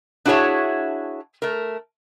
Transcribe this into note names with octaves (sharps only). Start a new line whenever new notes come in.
D4 E4 F#4 G#4 C#5 E5
A3 A#4